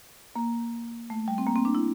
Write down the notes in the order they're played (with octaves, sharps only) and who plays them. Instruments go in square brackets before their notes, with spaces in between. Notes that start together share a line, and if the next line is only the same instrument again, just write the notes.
[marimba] A#3
A3
G3
C4
A#3
C4
D4
E4